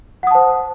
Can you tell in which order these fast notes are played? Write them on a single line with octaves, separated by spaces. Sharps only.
F#5 D#6 A5 C5